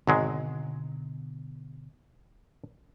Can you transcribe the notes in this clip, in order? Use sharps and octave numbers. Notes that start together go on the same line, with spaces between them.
G#1 B2 D3 F#3 G#3 B3